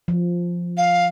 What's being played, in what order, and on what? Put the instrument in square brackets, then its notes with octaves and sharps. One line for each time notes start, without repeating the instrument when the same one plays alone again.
[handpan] F3
[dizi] F5